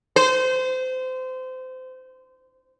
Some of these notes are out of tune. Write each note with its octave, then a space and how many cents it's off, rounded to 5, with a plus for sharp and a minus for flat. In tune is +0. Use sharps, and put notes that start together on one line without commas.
C5 -25